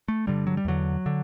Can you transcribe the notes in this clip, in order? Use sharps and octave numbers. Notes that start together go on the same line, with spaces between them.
A3
G2 D3 G3
F#3
G3
E2 D3 F#3
D3